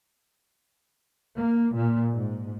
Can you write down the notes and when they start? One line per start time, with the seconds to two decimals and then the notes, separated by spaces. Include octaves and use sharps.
1.36 A#3
1.74 A#2
2.14 G#2